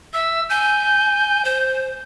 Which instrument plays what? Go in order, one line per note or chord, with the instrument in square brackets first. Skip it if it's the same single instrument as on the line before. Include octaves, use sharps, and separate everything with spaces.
[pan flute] E5 [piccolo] E6
[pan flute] G#5 [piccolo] G6
[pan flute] C5